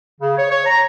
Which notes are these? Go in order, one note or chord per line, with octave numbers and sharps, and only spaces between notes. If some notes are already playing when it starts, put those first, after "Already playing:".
C#3
C#5
C#5
A#5